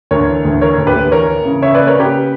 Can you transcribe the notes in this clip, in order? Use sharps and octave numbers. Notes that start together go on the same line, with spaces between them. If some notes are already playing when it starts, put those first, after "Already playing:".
D2 A#4 C#5
E3
D2
E3 A#4 C#5
D2
G4 B4
D2
E3 A#4 C#5
E3
C#3
C#3 C#5 E5
B4 D5
A#3
A#4 C#5
C#3 G4 B4